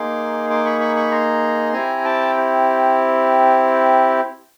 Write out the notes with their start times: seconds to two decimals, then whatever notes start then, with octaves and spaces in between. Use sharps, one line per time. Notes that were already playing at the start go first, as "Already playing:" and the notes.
Already playing: A#3 D#4 G#4 C6 D6
0.50 C6 D6
0.65 B5 C#6
0.80 B5 C#6
0.96 B5 C#6
1.11 A#5 C6
1.73 C4 E4 G4 G#5 A#5
2.04 G5 A5